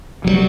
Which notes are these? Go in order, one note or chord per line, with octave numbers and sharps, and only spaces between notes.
D#3 F#3 G3